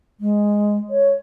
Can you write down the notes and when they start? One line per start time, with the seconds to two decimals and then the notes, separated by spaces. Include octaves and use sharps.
0.20 G#3
0.90 C#5